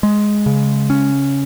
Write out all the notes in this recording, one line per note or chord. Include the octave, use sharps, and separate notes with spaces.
G#3
C#3
C#4